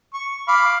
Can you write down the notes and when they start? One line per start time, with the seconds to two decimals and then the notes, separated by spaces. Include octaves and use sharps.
0.14 C#6
0.48 F5 B5 D6